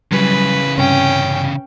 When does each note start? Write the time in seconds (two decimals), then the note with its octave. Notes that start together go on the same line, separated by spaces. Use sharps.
0.12 C#3 E3 F#3 G3 B4
0.78 G2 C3 C#4 G5